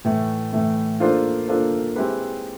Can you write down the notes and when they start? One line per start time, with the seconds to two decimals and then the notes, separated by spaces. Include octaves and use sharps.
0.04 A2 E3 A3
0.53 A2 E3 A3
1.00 A#3 D4 F4 A4 C5
1.48 A#3 D4 F4 A4 C5
1.96 G#3 C4 E4 G4 B4